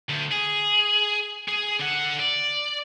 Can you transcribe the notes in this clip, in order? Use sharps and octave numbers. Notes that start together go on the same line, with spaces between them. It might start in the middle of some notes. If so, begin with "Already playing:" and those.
D2
G#4
G#4
D3 F#5
D5